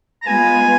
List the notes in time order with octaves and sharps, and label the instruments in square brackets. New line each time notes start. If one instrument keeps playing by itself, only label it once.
[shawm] A#5
[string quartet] G#3 B3 F4 B4 [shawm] G#5